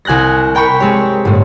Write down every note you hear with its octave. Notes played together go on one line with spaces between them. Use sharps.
C2 G#5 F#6 G6 A#6
A#4 G5 B5 C#6
G#3 C4 G4 C#5
G1 A2